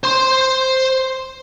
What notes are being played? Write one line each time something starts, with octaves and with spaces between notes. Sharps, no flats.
C5 C6